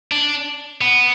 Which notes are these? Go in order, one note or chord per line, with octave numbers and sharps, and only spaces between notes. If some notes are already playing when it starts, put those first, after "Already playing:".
D4
B3